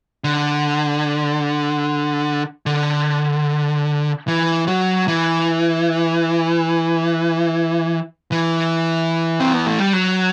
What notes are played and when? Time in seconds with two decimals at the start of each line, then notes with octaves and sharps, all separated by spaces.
0.24 D3
2.66 D3
4.28 E3
4.68 F#3
5.08 E3
8.32 E3
9.40 C4
9.53 B3
9.66 A3
9.80 G3
9.93 F#3